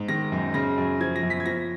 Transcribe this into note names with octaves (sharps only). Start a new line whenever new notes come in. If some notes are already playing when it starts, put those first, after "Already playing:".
Already playing: G#2
D#3 A#6
F#2
C#3 A#6
F#2
F3 G#6
A#6
F#2
B6
G#6
F3 A#6